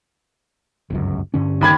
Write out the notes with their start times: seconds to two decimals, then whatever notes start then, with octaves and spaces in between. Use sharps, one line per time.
0.90 G1 C#2 F#2
1.34 G2 D3 C#4
1.61 D#2 B5 G#6